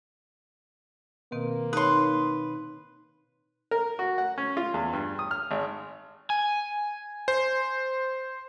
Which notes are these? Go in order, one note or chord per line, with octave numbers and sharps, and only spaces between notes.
B2 D#3 A#3 C4
D#4 B4 C#5 C6
A#4
F#4
F#5
C#4
F4
E2
G2
D#6
F6
G#1
G#5
C5